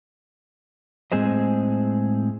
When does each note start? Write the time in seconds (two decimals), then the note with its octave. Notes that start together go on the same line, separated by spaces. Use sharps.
1.12 A2 G#3 C4 G#4 C5 D#5